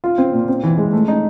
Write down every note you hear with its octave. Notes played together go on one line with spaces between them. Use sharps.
F4
C4
A#2
C4
E3
G#3
A3
D#4